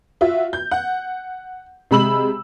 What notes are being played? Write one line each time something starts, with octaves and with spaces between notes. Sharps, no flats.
F4 F#4 E5
G6
F#5
C3 G#3 B5 E6 F#7